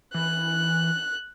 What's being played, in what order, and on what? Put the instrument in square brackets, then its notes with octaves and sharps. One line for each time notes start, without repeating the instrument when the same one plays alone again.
[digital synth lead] E3 [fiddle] F#6